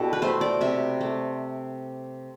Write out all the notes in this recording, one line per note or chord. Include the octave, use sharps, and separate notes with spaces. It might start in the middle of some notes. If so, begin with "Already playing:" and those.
Already playing: B2 D4 E4 G4 A4
B4
A3 C5
D5
C3 E5
A3